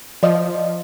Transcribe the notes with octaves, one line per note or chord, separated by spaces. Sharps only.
F3 D5 D#5